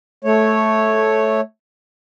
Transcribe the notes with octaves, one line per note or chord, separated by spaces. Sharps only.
A3 C#5